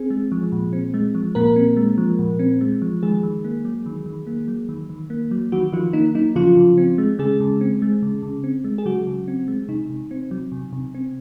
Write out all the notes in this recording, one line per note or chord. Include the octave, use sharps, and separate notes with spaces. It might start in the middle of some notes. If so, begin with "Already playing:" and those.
Already playing: C4 G#4
G#3
F3
A#2
C4
G#3
F3
A#2 A#3 A#4
C4
G#3
F3
A#2
C4
G#3
F3
D#3 G#3 G#4
D#3
A#3
F#3
D#3
D#3
A#3
F#3
D#3
D#3
A#3
F#3
D#3 F#3 F#4
D#3 F3 F4
A#3 D#4
F#3 D#4
C#3 F3 F4
C#3
C4
G#3
C#3 G#3 G#4
C#3
C4
G#3
C#3
C#3
C4
G#3
G#4
C#3 F#3 F#4
C#3
C4
G#3
C3 D#4
C3
C4
F#3
C3
C3
C4